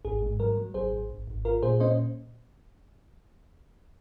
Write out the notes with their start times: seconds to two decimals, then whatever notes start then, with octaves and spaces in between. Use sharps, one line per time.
0.05 G#1 G#4
0.22 G#2
0.40 F#3 A#4
0.57 F#3
0.74 G#1 G#4 C5
0.92 G#1
1.10 G#1
1.27 G#1
1.45 F4 A#4
1.63 A#2 G#4 C5
1.80 C#4 C5 D#5